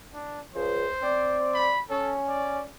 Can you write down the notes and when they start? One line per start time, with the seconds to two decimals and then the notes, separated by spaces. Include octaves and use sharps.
0.14 D4
0.55 C#2 C5
1.02 C4 D5
1.54 B5
1.90 C#4 A4
2.28 D5